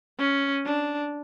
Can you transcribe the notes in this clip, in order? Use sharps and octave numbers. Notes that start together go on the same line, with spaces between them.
C#4
D4